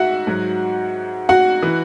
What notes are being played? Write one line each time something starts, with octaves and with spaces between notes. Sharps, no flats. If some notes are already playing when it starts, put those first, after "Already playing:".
Already playing: G#2 F#4 E5 F#5
G#2 F#3
F#4 F#5
E3